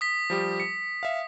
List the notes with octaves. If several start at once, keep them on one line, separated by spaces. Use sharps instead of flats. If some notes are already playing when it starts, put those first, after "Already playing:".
D#6 B6
F3 G3 G4
C#7
E5 F5